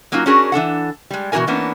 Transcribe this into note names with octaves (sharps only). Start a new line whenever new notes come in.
F#3 A#3 C#4 D#4 F4 F#4
C#4 D4 F#4 G#4 A#4
E3 D4 A4 F#5
G3 G#3
B2 E3 E4 F#4 A#4 G#5
E3 A#3 B3 C#4 D4